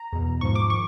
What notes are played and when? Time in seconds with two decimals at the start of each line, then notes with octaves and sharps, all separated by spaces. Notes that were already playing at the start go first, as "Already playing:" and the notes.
Already playing: A#5
0.13 E2 B2
0.41 G#2 F3 C#6
0.55 D6
0.70 D#3 C#6